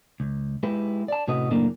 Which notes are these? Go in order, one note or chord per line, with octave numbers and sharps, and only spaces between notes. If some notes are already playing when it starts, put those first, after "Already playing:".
C#2
G#3 E4 G4 B4
D5 A5
A2 C3 C#4 F#4 B4 D#5
F#2 A2 C#3 A#3 D4